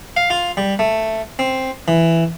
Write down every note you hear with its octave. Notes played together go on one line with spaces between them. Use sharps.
F5
F4
G3
A3
C4
E3